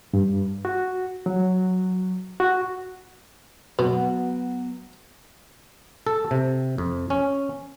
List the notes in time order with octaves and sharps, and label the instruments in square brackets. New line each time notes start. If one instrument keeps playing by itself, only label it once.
[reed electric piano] G2
F#4
F#3
F#4
[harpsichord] B2 [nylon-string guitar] F#3 B3
[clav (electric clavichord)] A4
C3
F2
C#4